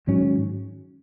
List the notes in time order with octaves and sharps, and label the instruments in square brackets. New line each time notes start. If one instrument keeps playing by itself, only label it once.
[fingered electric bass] G#2 D#3 F#3 C#4